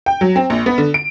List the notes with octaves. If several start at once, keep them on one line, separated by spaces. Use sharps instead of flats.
G5
F#3
C4
A#1
B3
D3
D7